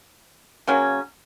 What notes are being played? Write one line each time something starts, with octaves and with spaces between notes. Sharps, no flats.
C#3 F#3 A#3 C#4